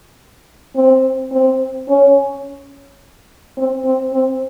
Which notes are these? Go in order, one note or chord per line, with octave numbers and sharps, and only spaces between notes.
C4
C4
C#4
C4
C4
C4